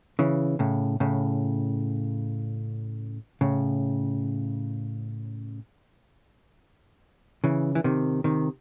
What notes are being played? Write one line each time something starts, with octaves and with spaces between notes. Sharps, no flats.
C#3 E3
A2 C#3
A2 C#3
A2 C#3
C#3 E3
E3
C3 D#3
C3 D#3